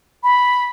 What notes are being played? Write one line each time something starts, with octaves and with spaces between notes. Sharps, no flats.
B5